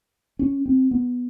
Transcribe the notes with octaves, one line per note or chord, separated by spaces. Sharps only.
C#4
C4
B3